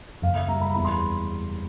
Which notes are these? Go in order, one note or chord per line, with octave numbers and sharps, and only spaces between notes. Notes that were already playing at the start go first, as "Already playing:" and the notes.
F#1 F5
E5
G3 A#5
B5
E2 B5
C6
B5